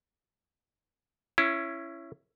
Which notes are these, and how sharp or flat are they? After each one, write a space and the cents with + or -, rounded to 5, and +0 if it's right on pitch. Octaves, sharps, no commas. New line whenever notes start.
C#4 -5 E4 +20